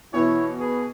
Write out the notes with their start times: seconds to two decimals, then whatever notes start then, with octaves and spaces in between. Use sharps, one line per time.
0.14 B2 E3 E4 C#5
0.60 G#4 B4